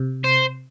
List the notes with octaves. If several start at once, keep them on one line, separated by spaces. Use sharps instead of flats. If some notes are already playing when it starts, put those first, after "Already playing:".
Already playing: C3
C5